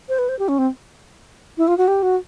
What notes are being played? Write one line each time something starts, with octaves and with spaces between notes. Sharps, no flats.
C5
B4
C5
G4
C#4
C4
E4
F4
F#4
G4
F#4